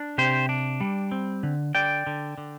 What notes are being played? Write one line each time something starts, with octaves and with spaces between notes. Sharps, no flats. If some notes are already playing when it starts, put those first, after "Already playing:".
Already playing: D4
C3 G4 C5
D4
G3
C4
D3
D3 D5 G5
D3
D3